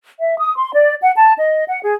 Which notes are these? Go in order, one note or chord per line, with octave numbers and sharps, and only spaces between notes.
E5
D#6
C6
D5
F#5
A5
D#5
F#5
G#4